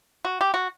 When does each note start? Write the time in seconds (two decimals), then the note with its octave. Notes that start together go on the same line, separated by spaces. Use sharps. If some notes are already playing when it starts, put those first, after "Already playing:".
0.25 F#4
0.41 G4
0.54 F#4